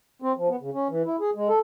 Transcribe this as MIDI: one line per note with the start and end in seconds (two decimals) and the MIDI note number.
0.22 0.32 60
0.37 0.49 53
0.49 0.56 59
0.61 0.70 49
0.74 0.88 61
0.90 1.02 52
1.06 1.16 64
1.21 1.30 68
1.35 1.48 56
1.49 1.59 69